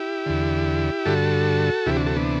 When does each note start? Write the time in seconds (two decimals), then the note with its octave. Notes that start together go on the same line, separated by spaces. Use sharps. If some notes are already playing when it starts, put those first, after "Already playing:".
Already playing: E4 G4
0.26 E2 D3
1.06 G2 D3 F#4 A4
1.86 D2 C3 E3 E4 G4
1.96 D4 F#4
2.06 F#4 A4
2.16 B3 D4